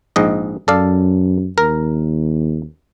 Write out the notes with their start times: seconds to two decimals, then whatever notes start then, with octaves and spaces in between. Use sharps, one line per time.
0.16 A#1 G#2 D#5
0.68 F#2 A4 D5 F5
1.58 D#2 A#4